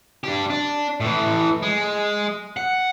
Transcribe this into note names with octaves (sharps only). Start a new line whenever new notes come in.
D4 G4
D4
A2 E3
G#3
F#5